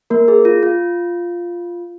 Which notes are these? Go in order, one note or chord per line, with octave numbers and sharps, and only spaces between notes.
A#3 A#4
G#4
F4
F4